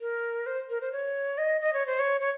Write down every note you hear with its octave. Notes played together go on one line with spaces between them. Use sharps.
A#4
C5
A#4
C5
C#5
D#5
D#5
C#5
C5
C#5
C#5